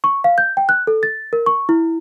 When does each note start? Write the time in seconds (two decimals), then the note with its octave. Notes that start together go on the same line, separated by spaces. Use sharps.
0.04 C#6
0.24 F5
0.38 G6
0.57 G5
0.69 F#6
0.87 A4
1.03 A6
1.33 A#4
1.46 C#6
1.69 E4